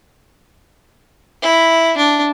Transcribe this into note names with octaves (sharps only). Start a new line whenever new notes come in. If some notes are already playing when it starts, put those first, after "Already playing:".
E4
D4